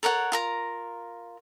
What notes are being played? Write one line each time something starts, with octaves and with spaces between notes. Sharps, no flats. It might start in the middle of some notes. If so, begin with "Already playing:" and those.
A4 A#4 C#5 F#5
F4 A#4 A#5